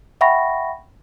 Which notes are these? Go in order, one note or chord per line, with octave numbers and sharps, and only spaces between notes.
E5 F#5 G5 B5 C#6 A#6